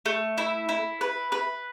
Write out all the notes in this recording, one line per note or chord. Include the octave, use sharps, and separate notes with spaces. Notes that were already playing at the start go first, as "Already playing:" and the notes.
A3
E4
E4
B4
B4